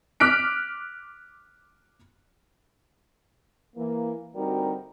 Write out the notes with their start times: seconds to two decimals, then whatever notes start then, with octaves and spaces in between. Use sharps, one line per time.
0.20 D6 F6 F#6 B6 D7
3.76 E3 A#3
4.35 D2 G3 C4 D#4 F#4 A#4